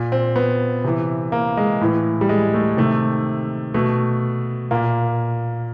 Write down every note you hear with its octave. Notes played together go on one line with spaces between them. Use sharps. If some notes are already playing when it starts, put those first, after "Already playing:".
Already playing: A#2
C4
B3
C3 E3
A#3
G#3
A2 E3
G3
G#3
A3
C3 D#3 A3
B2 A3
A#2 A#3